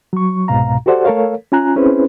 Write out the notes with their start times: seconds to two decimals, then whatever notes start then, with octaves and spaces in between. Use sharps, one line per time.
0.13 F#3 C#6
0.48 C2 G#2 B2 F5 A#5
0.86 F#4 G4 A4 C5 D5 F#5
1.05 A3 A4 A#4 C#5 F5
1.52 C#4 F4 G#5 A#5 F#6
1.76 C4 C#4 E4 G#4 B4 C5